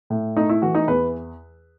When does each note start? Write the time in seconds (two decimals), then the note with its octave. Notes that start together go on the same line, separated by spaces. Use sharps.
0.10 A2
0.36 A3 D#4
0.49 E4
0.62 E3 F#4
0.75 D#4
0.88 E2 B4